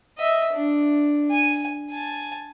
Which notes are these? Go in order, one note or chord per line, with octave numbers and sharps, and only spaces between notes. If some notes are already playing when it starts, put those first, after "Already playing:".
D#5 E5
D4
G#5
G#5 A5